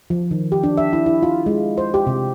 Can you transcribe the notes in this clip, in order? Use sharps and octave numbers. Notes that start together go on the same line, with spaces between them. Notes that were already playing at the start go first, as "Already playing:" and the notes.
F3
D#3
G4
D4
E5
E4
E4
F4
G#3
C5
G4
C3